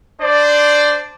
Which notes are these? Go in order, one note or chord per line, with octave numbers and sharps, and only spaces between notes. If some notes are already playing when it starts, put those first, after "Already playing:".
D4 C5 D5